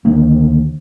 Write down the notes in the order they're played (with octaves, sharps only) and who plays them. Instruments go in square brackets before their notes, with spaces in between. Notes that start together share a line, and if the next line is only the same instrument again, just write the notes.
[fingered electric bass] D2 D3 D#3 A#3